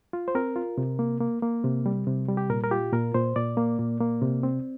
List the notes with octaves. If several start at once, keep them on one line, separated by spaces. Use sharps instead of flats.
F4
C5
C4 A#4
F4
C3
A#3
A#3
A#3
C3
G3
C3
G3
G4
A#2 A#4
A#4
F4 G4
A#2 A#4
A#2 C5
A#2 D5
A#3
A#2
A#3
C3
C4